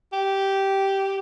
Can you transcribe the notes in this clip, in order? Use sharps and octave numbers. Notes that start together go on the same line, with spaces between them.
G4